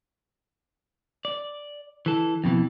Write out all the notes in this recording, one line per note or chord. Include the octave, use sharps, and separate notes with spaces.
D5
E3 A4
F2 B2 D#3 E3